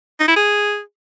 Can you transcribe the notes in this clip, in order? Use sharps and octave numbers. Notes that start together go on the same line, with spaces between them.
D#4
E4
G#4